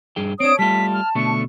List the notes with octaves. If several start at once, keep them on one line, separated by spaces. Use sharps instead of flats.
G2 G#4 G5
C4 D4 C#5 D#6 D7
G3 A3 F4 A5 B6
F6
B2 D3 A3 C#6